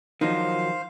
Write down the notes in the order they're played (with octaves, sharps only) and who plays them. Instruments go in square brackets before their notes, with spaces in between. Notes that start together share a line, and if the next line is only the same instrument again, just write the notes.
[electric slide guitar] D#3 F3 F#3 [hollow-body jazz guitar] D#4 [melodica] C5 F5